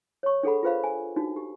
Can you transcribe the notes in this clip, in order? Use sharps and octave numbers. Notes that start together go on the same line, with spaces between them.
C#5 C#6
D4 G#4 A4 F#5 B5
F4 G#4 B4 C5 F5 B5
G#5
D4 D#4 F#4
G4